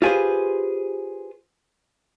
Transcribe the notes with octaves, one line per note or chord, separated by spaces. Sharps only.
F4 G4 G#4 B4 C5